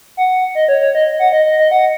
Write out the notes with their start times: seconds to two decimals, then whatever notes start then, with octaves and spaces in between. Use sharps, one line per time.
0.17 F#5
0.55 D#5
0.68 C#5
0.81 C#5
0.95 D#5
1.19 F#5
1.32 D#5
1.45 D#5
1.59 D#5
1.71 F#5